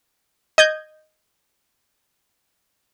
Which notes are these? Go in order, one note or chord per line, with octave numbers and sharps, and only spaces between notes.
D#5 G6 G#6